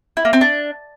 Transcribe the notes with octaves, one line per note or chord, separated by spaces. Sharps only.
E4
A#3
C4
D4